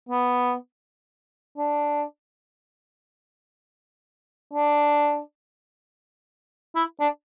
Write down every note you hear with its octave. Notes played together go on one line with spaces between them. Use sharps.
B3
D4
D4
E4
D4